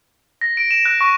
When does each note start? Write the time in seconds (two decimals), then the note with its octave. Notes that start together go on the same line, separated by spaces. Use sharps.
0.41 A#6
0.57 D7
0.71 E7
0.85 F#6
1.01 C#6